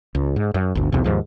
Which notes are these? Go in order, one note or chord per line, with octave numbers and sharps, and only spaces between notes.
C#2
G#2
F#2
G1 D2
B1 E2 C3
D#2 G#2 F3